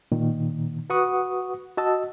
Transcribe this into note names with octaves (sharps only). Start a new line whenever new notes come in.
A#2 D#3
F#4 B4 F#5 C#6 D#6
F#4 D#5 A5 E6